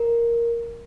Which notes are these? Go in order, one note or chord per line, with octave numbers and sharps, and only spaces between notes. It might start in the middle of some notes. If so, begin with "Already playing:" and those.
Already playing: A#4